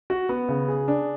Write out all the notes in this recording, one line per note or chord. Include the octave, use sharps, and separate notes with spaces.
F#4
B3
C#3
G#4
D4